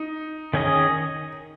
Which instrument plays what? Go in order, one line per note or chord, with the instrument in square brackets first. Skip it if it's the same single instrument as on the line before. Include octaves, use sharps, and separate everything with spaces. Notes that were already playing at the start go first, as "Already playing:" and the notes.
Already playing: [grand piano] D#4
[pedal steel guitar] D#3 C#4 G#4 D#5